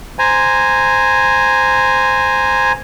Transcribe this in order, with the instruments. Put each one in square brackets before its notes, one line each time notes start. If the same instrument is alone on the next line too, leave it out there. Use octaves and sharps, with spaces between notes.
[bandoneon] C5 G#5 A#5